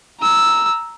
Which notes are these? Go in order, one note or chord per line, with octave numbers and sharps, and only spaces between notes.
A#5 E6